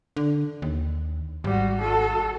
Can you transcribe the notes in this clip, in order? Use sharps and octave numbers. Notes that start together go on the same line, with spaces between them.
D3
D#2
G#1 G3 F#4
F#4 A4